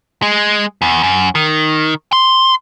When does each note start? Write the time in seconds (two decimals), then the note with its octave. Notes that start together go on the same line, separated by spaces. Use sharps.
0.22 G#3
0.82 E2
1.03 F#2
1.35 D#3
2.13 C6